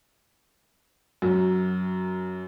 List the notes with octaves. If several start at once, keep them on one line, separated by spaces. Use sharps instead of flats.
F#2